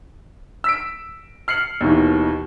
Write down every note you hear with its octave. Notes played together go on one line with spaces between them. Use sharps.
E6 B6 D7
F6 C7 C#7 F#7
D#2 B2 D#3 E3